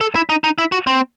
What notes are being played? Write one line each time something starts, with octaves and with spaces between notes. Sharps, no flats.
A4
E4
D#4
D#4
E4
F#4
C4